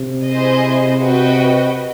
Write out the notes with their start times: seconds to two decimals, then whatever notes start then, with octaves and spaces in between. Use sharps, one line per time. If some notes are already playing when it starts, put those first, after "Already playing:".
Already playing: C3
0.26 E4 G#4 C5 D#5
1.01 F#4 B4 D#5 G5